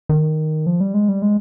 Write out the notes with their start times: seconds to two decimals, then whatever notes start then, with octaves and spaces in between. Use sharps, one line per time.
0.09 D#3
0.67 F3
0.81 G3
0.94 G#3
1.09 G3
1.22 G#3